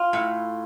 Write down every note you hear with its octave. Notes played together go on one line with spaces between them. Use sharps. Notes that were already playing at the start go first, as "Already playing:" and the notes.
Already playing: F4
A2